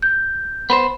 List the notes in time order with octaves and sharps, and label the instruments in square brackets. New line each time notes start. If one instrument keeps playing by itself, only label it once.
[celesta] G6
[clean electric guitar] B3 B4 C5 [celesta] B5